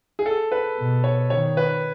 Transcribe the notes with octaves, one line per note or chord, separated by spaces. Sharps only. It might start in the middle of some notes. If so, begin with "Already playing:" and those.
G#4
A4
B4
B2
C#5
D#3 C#5
B4